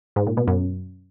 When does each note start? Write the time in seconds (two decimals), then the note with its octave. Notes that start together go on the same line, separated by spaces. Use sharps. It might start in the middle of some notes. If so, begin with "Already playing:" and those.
0.16 G#2
0.27 A#2
0.37 B2
0.48 F#2